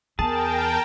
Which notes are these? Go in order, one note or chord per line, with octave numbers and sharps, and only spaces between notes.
E2 G#4 A#4 G5 A5